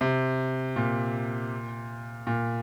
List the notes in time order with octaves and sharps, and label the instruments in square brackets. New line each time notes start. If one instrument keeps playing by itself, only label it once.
[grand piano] C3
A#2
A#2